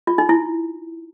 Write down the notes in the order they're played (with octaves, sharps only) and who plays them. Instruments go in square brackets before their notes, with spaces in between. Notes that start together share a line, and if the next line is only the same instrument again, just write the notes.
[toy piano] F4
D#4
E4